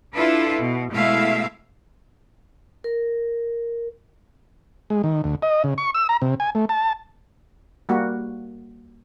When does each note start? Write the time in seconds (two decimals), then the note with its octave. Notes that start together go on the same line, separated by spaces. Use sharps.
0.14 D4 E4 F4 A4 B4
0.60 B2
0.92 B2 G#3 A3 E4 E5 F5
2.84 A#4
4.90 G#3
5.04 D#3
5.24 D2
5.42 D#5
5.64 C#3
5.78 C#6
5.94 E6
6.09 A#5
6.22 C3
6.40 G#5
6.55 A3
6.69 A5
7.89 G3 A#3 F#4